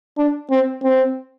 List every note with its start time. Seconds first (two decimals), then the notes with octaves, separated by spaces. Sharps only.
0.18 D4
0.51 C4
0.83 C4